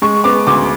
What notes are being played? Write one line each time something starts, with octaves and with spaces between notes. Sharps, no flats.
G#3 C#6
B3 D6
D2 D6